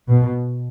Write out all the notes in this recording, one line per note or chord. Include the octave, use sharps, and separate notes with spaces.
B2